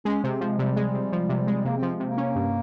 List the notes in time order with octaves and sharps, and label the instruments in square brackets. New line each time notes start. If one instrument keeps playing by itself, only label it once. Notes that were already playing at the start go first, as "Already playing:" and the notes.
[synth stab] G#3 [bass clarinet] C#4
[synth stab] C3 [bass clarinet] C4
[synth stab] F3 [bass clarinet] G#3
[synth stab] C3 [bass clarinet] G3
[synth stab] G#3
C3
F3
C3
G#3
[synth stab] C3 [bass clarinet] A#3
[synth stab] F3 [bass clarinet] C4
[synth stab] C3 [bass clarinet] A#3
[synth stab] C#4
G2